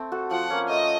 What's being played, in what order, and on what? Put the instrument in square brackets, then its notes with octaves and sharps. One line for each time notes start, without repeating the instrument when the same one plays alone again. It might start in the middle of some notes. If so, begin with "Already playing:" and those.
Already playing: [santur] A3 C4
F#4 A4
[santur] F3 [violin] F#5
[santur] A#3 C#4
[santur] A3 [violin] D#5